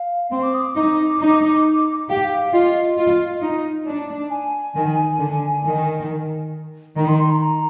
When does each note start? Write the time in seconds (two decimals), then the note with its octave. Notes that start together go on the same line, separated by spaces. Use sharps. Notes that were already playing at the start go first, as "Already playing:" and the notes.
Already playing: F5
0.31 C4 C6
0.43 D6
0.54 D#6
0.64 D6
0.76 D#4 D6
1.20 D#4
2.09 G4 F5
2.16 G5
2.24 F5
2.53 F4 D#5
2.98 F4
3.43 D#4
3.87 D4
4.30 G#5
4.76 D#3
5.19 D3
5.64 D#3
6.97 D#3 A#5
7.08 C6
7.19 C6
7.31 A#5
7.42 A#5